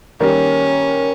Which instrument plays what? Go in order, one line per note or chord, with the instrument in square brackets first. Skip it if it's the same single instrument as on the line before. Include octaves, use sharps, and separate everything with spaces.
[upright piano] D#3 G3 A#3 [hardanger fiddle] C#4